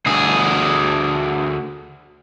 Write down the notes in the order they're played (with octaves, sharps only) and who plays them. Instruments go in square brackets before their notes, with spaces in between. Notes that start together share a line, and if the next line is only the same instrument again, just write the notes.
[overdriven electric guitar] D2 G#4